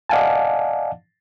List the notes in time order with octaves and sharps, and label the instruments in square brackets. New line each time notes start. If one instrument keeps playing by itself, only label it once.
[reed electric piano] D5 D#5 F5 F#5 G#5 A5